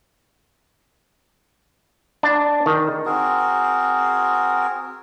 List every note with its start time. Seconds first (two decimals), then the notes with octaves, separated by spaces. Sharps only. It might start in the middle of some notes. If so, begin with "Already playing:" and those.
2.23 D4
2.66 D#3
3.06 C4 F#4 G#4 A#4